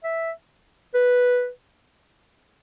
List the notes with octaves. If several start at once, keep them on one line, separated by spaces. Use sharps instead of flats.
E5
B4